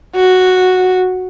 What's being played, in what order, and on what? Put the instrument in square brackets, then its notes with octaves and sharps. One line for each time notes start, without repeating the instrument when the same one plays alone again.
[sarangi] F#4